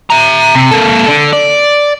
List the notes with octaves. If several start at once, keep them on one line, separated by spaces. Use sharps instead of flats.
E5 A#5
C3
A#3 A4
D3
D5